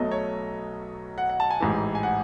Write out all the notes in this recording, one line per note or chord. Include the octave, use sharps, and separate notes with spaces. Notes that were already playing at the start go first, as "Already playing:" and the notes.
Already playing: B1 B2 F#3 A3 D#5
C#5
F#5
F#5
A5
G#5
A1 G#2 E3
G#5
F#5